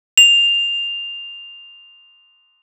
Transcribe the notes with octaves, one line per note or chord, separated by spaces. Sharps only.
F7